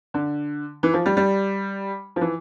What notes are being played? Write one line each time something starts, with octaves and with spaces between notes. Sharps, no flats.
D3
E3
F3
G3
G3
F3
E3